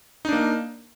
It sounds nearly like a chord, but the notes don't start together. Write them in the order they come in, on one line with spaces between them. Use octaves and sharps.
D#4 D4 A#3